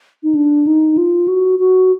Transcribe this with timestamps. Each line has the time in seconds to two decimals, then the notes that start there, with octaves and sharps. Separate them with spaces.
0.23 D#4
0.35 D4
0.67 D#4
0.97 F4
1.28 F#4
1.59 F#4